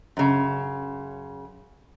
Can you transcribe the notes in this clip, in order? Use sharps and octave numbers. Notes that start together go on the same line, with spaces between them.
F#2 C#3